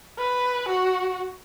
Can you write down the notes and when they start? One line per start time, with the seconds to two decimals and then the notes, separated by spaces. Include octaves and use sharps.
0.18 B4
0.69 F#4